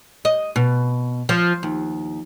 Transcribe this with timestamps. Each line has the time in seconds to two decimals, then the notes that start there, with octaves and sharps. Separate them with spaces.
0.25 D#5
0.56 B2
1.29 F3
1.63 D#2